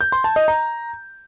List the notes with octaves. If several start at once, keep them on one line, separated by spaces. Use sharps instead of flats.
G6
C6
A5
D#5
A#5